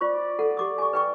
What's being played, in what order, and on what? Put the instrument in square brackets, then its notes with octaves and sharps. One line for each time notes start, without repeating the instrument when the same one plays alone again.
[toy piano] F4 C5 C#6 [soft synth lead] D5
[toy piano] A4 F#5
G4 D6 D#6
G#5 C#6
B4 G5 C#6